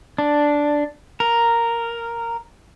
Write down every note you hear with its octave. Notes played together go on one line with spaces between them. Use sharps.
D4
A#4